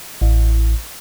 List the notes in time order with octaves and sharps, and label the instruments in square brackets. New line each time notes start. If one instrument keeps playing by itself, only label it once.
[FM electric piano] A1